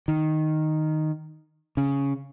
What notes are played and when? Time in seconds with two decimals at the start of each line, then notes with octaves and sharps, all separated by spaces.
0.08 D#3
1.77 C#3